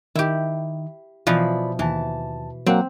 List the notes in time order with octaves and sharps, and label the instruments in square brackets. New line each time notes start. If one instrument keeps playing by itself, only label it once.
[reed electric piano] D#3 [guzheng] E4 G4
[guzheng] B2 E3 F3 [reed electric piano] F4 D5 B5
[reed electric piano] D#2 A5 [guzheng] E3
[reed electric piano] F#3 A#3 F#5 [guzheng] C4